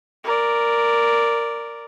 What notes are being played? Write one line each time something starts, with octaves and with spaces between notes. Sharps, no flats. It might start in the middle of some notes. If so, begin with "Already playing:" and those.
A#4 D5